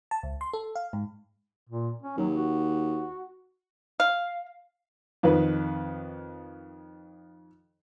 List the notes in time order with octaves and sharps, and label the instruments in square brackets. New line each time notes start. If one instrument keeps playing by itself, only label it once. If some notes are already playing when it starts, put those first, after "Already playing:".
[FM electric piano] A5
C#2
C6
A4
F5
G#2
[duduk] A#2
C#4
[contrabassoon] D#2 [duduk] F#3
[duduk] F#4
[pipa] F5
[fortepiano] F2 D#3 B4